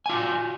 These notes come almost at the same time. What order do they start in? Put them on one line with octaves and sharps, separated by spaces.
G#5 F4 F#4